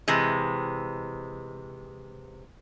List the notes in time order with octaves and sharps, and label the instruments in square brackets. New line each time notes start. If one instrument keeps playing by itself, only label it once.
[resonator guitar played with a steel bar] C3 E3 G#3